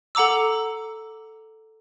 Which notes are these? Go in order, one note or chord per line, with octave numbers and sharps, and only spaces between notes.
A4 F#5 A#5 D6 E6